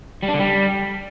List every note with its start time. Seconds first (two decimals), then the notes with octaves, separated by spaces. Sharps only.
0.23 G3
0.28 D4
0.34 D3
0.39 G3